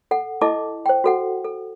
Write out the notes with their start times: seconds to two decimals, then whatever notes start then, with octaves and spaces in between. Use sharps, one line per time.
0.11 A4 F#5
0.41 E4 A4 D#5 E5 A5 D6
0.86 C5 G5
1.04 F#4 A4 F#5
1.45 A4